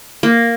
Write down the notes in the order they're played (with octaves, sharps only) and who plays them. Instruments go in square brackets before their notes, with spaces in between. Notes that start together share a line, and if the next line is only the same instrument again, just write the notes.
[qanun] A#3